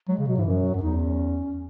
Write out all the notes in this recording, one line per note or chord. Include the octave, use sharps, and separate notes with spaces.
F#3 G#3
C#3
B2 F#3
G#2 E3
F#2
F#3
F#2
E2 D#4
C#4